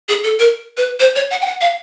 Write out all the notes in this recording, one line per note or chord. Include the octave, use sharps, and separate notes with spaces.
G#4
A4
A#4
B4
C5
C#5
F#5
G5
F#5
F5